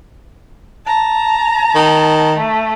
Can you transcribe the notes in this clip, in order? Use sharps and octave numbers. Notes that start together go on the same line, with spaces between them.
A5 A#5
D#3
A3